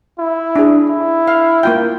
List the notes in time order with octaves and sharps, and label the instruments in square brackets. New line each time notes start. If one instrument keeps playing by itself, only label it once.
[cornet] E4
[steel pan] D4 G#4
[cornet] E4
[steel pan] F5
A#3 F4 G5